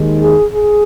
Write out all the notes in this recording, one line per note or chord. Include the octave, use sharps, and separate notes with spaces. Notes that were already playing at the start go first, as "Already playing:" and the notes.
Already playing: D#2 D#3 G#3
G#4
G#4